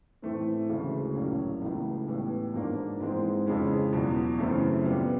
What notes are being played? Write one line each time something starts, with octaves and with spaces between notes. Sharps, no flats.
A2 E3 A3 C4
D2 C#3 E3 G#3
A#1 A2 F#3 A#3 C#4
C#2 C#3 E3 A3
A2 E3 G3 B3
G#2 F3 A#3 D4
G#2 E3 G#3 C4
F2 C#3 E3 G#3 C#4
E2 B2 F#3
F#2 C#3 E3 A3 C4
A#2 G3 B3